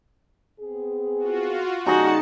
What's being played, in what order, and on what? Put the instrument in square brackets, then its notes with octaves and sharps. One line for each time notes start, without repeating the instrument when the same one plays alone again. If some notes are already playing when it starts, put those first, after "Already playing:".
[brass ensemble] B3 C4 G#4
[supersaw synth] F4 F#4
[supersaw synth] C#3 A5 C#7 [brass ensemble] G3 [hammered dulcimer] D#4 G#4 D#5 [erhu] F#4